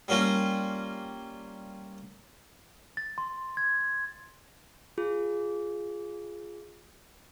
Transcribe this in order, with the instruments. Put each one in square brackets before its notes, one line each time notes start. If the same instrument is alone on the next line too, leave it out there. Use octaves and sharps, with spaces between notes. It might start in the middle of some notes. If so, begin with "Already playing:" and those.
[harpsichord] G3 A#3 C#4 F4
[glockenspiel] A6
C6
G#6
[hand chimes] F4 G#4